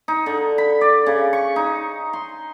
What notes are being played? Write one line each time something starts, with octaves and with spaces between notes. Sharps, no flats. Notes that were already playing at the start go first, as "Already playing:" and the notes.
D#4
D3
B5
D5
C#3
C#6
D#4
C6